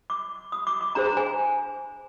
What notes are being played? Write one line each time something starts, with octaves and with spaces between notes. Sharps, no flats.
D6
D#6
D6
D6
D4 G#4 C5 A#5
G#5